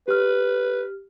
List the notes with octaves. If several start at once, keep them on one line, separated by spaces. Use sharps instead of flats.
G4 B4 F6